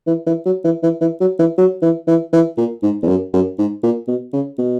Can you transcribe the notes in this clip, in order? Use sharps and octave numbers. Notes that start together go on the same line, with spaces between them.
E3
E3
F#3
E3
E3
E3
F#3
E3
F#3
E3
E3
E3
A#2
G#2
E2
F#2
F#2
G#2
A#2
B2
C#3
B2